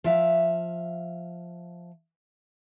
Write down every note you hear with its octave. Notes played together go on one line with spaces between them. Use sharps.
F3 E5 F5